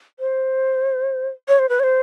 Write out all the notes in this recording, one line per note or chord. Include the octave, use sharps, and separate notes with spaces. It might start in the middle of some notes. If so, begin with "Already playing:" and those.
C5
C#5
C5
B4
C#5
C5